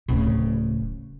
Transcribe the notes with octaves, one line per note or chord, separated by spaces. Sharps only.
D1 C#3